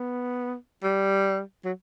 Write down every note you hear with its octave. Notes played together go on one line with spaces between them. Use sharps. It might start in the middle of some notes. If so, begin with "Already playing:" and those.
Already playing: B3
G3
F#3